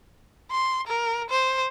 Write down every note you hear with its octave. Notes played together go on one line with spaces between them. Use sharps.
C6
A#4
C5